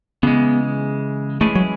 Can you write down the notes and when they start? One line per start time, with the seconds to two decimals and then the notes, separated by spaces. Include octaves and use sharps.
0.23 C#3 E3 G#3 B3
1.41 E3 G#3 A3 C#4 E4 G#4
1.55 F#3